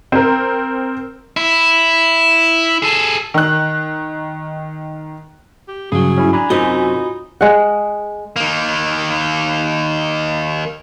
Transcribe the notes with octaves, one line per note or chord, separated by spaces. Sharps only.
C4 A#4
E4
G#4 A4
D#3 F#6
G4
G2 C#3 F#3 G#4
C#4 E4
D4 G#5 A#5 B5
F#2 C3 D#4 F4 F#4
G#3 F#5
D#3 A#3